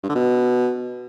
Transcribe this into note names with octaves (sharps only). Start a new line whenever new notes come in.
G2
D3
B2